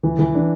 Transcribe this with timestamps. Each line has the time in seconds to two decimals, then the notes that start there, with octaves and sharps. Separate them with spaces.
0.03 E3
0.19 E3
0.35 D4